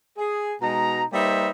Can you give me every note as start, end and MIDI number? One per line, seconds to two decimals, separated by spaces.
0.18 0.53 68
0.62 1.04 47
0.62 1.04 56
0.62 1.04 63
0.62 1.04 82
1.13 1.50 55
1.13 1.50 58
1.13 1.50 63
1.13 1.50 71
1.13 1.50 72
1.13 1.50 76